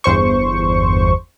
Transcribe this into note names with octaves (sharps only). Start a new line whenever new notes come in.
G1 E2 C5 C#6